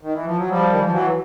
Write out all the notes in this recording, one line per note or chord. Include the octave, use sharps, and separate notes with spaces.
D#3
E3
F3
F#3
F3 G3
D#3
E3
F3
E3 F#3